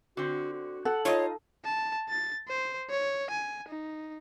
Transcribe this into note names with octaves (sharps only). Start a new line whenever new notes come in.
D3 C4 F#4
F#4
A4 F#5
D#4 F4 C#5 D#5
A5
A6
C5
C#5
G#5
D#4